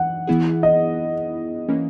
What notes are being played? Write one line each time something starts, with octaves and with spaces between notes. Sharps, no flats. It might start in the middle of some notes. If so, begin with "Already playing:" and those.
Already playing: E3 F#5
E3 B3 E4 G#4
D#5
E3 A#3 C#4